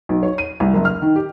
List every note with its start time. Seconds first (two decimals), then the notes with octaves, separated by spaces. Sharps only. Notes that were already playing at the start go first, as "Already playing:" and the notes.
0.09 B1
0.23 C#5
0.38 D#7
0.60 C2
0.74 F#1
0.85 F6
1.02 D#3
1.16 G4